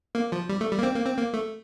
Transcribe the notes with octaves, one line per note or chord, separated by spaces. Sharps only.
A#3
F3
G3
A3
G3
A#3
C4
A#3
C4
A#3
A3